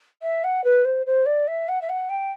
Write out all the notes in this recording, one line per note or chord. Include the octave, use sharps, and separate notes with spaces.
E5
F#5
B4
C5
C5
D5
E5
F#5
E5
F#5
G5